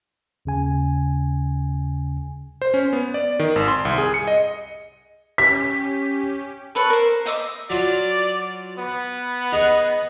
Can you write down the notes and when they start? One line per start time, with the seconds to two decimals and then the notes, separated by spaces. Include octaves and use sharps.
0.45 D#2 C#3 G#5
2.62 C5
2.74 C#4
2.93 B3
3.14 D5
3.39 D#3
3.56 G#1
3.68 C6
3.85 C2
3.98 G#4
4.14 C#7
4.27 D#5
5.38 C#4 G4 B6
6.75 A4 B4 C#5
6.90 A#4 C5
7.25 C5 D#5 E5 D6
7.70 F#3 F4 D5
8.78 B3
9.52 D#4 G#4 F#5